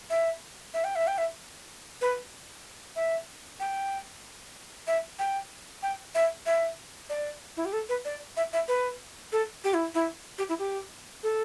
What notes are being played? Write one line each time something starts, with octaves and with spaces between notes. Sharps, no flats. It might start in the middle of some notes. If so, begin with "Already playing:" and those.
E5
E5
G5
E5
G5
E5
B4
E5
G5
E5
G5
G5
E5
E5
D5
E4
G4
A4
B4
D5
E5
E5
B4
A4
G4
E4
E4
G4
E4
G4
A4